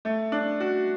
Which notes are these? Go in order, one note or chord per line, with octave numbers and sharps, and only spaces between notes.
A3
D4
F#4